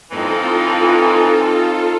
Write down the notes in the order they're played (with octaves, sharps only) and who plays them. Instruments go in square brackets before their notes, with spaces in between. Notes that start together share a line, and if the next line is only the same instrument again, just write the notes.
[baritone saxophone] E3 [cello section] C4 D#4 [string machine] F4 A4